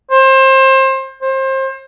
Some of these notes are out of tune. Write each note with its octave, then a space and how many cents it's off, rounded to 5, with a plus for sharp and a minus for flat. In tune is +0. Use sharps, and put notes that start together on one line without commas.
C5 +25
C5 +30